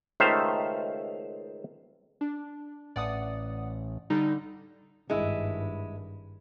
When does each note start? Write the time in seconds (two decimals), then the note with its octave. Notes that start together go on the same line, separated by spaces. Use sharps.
0.20 C#2 D#3 A3 C5 E5 F5
2.21 D4
2.96 A1 D5 F#5 D#6
4.10 D3 G3 D#4
5.10 G#1 G2 G#3 E4